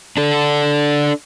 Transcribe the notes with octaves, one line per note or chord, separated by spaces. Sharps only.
D4 A4